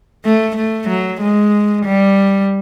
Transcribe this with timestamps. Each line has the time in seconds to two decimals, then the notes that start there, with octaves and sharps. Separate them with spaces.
0.24 A3
0.56 A3
0.88 F#3
1.21 G#3
1.85 G3